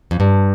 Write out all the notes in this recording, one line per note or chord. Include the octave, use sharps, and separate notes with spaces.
F2
G2